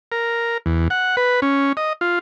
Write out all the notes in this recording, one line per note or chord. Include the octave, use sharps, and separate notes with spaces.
A#4
E2
F#5
B4
C#4
D#5
F4